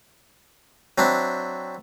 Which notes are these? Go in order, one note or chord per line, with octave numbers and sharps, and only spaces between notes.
F#3 C4 D4 E4